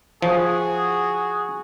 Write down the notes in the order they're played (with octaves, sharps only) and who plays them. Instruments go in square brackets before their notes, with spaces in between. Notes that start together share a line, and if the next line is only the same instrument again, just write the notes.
[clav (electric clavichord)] F3 [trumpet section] F#4 G#4